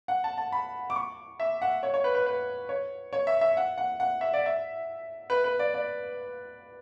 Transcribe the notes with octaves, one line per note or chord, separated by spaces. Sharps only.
F#5
A5
A5
B5
D6
C#6
E5
F#5
C#5
C#5
B4
B4
B4
C#5
C#5
E5
E5
F#5
F#5
F#5
E5
D5
E5
B4
B4
D5
D5